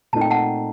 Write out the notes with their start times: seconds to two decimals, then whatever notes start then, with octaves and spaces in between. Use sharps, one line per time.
0.13 A#2 A3 C4 D#4 A5
0.21 G5
0.31 F#5 A5